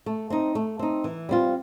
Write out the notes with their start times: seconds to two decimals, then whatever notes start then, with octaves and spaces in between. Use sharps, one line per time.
0.06 A3
0.30 C4 D#4
0.55 A3
0.79 C4 D#4
1.04 E3
1.29 G3 C4 F4